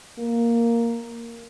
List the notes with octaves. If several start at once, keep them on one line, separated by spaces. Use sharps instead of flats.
A#3